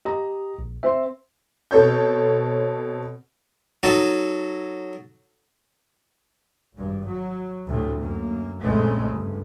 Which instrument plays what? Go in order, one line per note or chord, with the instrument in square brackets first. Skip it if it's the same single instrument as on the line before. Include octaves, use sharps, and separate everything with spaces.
[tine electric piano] G4 [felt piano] D#5 A#5
[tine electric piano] A#1
[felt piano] C4 C5 C6 [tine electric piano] E5
[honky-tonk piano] B2 C4 A4 C#5 G6
[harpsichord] F#3 D#4 A4
[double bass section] G#1 G2
F#3
D2 A2 C3
F#2 A#3
A#1 F2 C#3 G#3 A3 C4
G1